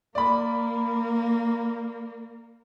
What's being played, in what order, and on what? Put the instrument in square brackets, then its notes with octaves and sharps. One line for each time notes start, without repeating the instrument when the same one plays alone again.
[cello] A#3 [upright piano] D5 B5